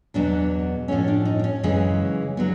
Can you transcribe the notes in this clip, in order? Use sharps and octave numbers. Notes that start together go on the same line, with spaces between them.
E2 B2 F#3 D4
A2 F3 A3 C#4
D4
D#4
D4
C#4
F#2 C#3 E3 G#3
D3 F#3 B3